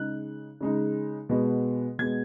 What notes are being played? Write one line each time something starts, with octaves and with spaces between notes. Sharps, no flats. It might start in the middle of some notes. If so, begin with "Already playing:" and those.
Already playing: C#3 G#3 D#4 F#6
C#3 G#3 D#4
B2 G#3 B3
B2 G#3 B3 G#6